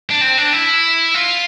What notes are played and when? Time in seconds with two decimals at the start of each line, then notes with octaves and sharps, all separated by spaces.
0.10 D4
0.21 C4
0.38 D4
0.53 E4
1.14 F4